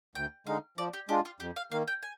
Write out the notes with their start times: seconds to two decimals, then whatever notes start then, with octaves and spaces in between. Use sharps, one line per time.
0.15 D2 G5
0.47 D3 G#3 D#4 F5
0.77 F3 D5
0.94 G4
1.09 G#3 D4 F4 G4
1.25 F4
1.40 F2 G4
1.56 F5
1.72 D#3 A#3 F5
1.88 G5
2.03 G#5